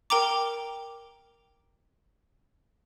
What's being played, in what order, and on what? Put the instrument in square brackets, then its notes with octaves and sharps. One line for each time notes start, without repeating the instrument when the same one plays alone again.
[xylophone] A#4 G5 A#5 D6